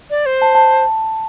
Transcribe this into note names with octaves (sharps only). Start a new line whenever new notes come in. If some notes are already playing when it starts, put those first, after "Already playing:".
D5
C5
A5
A5